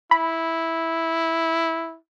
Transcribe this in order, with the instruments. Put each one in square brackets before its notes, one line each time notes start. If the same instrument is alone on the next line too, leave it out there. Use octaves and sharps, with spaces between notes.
[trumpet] E4 [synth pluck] B5